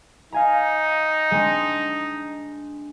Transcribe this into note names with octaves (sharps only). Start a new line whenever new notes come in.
D#4 F5 G#5 A#5
G#3 C4 D4